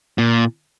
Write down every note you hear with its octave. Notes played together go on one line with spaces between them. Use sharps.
A#2